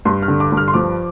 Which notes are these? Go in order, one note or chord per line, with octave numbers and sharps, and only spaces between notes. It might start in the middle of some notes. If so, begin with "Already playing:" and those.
G2 C6
F6
D3
D6
G2
F6
C6
F3 D6